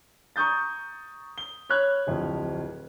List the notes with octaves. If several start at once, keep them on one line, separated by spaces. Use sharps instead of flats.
A#5 C#6 D#6 G6 A6
G7
C#5 B5 F6 F#6 G#6
D1 F2